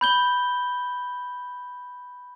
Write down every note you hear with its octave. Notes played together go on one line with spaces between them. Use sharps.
B5 G6 G7